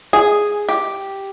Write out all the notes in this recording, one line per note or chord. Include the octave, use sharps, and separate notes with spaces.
G#4
G4